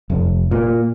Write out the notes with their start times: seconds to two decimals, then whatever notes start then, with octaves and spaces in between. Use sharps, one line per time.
0.10 F1
0.51 A#2